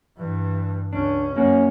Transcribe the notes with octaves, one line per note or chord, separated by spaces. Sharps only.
G2 E3
C#2 C#4 D4
F#2 A#3 C#4 F#4